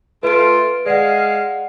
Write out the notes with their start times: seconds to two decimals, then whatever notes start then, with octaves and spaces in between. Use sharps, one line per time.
0.23 A3 F4 B4 D7
0.86 G#3 D5 F5 F#5